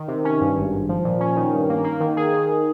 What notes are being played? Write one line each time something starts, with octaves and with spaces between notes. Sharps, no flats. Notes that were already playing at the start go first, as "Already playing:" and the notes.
Already playing: D#3
C3
C#4
G2
G#1
G#1
F3
A#2
C#4
D#3
G2
A#3
A#3
D#3
G#4
D#3